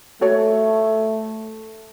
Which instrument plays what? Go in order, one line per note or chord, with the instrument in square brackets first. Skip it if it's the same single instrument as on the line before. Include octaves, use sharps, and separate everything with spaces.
[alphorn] A3 [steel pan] F#4 A4 C#5